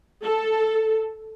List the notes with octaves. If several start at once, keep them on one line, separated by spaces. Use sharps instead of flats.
A4